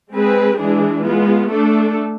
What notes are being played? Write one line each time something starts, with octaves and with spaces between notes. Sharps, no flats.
G#3 C4 G#4 B4
E3 G#3 D4 G#4
G#3 B3 F4
A3 D4 A4